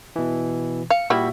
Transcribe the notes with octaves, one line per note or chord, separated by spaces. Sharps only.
B2 E3
F5 C#7
A#2 G3 E4 F#4 E5